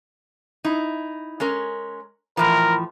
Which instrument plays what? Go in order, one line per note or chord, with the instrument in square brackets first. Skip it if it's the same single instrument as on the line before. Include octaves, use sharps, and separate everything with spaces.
[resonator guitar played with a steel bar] D#4 E4
G#3 C#4 A#4
[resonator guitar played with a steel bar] A2 E3 F3 [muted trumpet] A#4